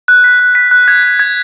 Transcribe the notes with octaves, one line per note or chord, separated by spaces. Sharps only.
F#6
B6
F#6
B6
F#6
G#6
G#6
G#6